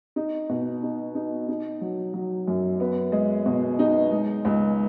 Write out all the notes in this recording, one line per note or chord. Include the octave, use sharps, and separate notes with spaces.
D#4
B2
D#4
D#4
D#4
F#3
F#3
F#2
B3
G#3
B2
D#4
G#3
C#2